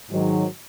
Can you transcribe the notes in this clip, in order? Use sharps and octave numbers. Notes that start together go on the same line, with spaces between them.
G#2 D#3 F#3